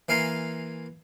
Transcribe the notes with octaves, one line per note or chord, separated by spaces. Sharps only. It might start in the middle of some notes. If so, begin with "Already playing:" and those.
E3 A#3 F5 G#5 A#5 C6